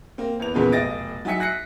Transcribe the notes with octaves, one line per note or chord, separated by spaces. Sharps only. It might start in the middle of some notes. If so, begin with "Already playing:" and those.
A#3 C4
E2 E3 F7
E2 A#2 C#3 F3 G#3 B3
F1 B1 D#5 A6 A#6 D7
F#3 D#4 E5 G#5 B6 C#7
F#6 A#6 C7 C#7